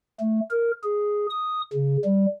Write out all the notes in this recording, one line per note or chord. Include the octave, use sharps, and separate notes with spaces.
A3
A#4
G#4
D#6
C#3
G3